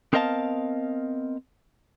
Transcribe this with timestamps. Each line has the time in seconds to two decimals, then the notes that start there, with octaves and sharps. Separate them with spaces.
0.13 B3 C4 A#4 D#5 F5 A5